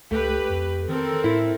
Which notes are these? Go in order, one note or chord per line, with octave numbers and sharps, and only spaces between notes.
C#2 A3 G4 B4
F2
D#3 C4 A4 A#4
A2 E4